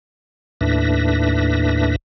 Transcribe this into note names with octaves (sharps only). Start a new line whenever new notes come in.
D#2 A2 D4 B4 E5 A#6